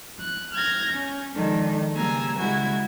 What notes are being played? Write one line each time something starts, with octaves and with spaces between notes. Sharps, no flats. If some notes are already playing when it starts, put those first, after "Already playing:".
F#6
F6 G6 G#6 A#6
C#4
D#3 F3 G#3 D4 A4
C#3 G3 A#3 G#5 A#5 E6
C#3 G3 G#3 E4 F#4 G#6